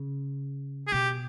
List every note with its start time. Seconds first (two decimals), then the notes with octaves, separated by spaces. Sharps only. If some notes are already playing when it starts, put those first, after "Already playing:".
Already playing: C#3
0.87 G#4
0.92 B2 G4